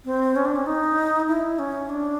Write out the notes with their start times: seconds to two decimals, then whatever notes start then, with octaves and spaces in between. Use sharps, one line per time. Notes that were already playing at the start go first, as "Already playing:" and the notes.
0.05 C4
0.36 C#4
0.45 D4
0.56 C#4
0.66 D#4
1.28 E4
1.59 C#4
1.89 D4